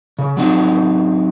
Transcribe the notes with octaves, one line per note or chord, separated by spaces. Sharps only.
C#3
F#3 C4 D#4